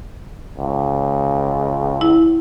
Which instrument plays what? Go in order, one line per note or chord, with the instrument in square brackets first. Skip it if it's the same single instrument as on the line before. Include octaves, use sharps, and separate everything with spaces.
[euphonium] C#2
[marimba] E4